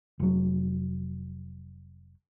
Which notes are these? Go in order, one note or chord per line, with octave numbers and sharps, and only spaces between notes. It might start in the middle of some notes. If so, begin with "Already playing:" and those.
F1 F#3